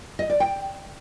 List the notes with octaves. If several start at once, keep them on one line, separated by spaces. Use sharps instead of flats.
D#5
D5
G5